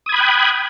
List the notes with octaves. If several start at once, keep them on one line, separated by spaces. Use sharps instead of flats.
G5 B5 D#6 F#6 G#6